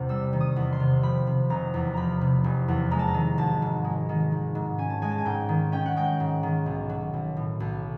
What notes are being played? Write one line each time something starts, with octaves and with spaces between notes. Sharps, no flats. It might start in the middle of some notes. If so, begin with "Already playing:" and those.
Already playing: E2 C3
G3 E6
D#3
D#6
E2
C6
C3
F3 B5
C3
F1 A#5
E2
F3 A#5 B5
C3
F1
E2
G#3 A#5
A5
A#5
D#3
G#1 A5
G#2
G#3
D#3
G#1
G#2
C#4 G#5
A5
G#3 G#5
A5
G#5
G#2 G5
D#3
C#4 G5
F#5
G#3 G5
G#2
D#3
B1
F#3
B1
A2
B1